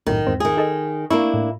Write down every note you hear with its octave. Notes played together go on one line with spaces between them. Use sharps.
B1 F#2 A2 D#3
E2 G#2 C4
D#3 G#4
D#4 A4 D#5
A#3 D4 E4 C#6
A2